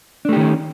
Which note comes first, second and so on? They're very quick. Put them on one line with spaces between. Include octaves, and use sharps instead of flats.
D4 A3 G4 D#3 C#4